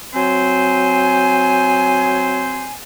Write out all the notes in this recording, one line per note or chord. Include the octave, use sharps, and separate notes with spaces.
F#3 C4 C5 G#5